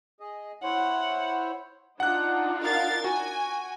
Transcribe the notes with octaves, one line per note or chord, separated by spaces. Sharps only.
G#4 D#5
E4 C5 C#5 F#5
D4 D#4 F4 F#5 F#6
A#4 F5 A6
F#4 G#5